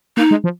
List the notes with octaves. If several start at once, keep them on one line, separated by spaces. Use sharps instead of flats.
A#3 D#4
G#3
F3